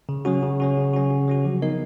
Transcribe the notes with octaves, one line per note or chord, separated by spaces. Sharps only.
C#3
F#3 C#4 F#4
C#3
F#3 C#4 F#4
C#3
F#3 C#4 F#4
C#3
F#3 C#4 F#4
F3
B3 D#4 A#4 D#5